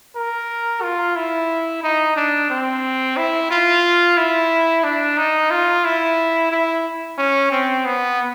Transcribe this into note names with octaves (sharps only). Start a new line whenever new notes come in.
A#4
F4
E4
D#4
D4
C4
E4
F4
E4
D4
D#4
F4
E4
E4
C#4
C4
B3